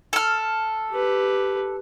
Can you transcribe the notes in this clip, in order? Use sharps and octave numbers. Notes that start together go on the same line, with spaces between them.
A4 F6
G4 B4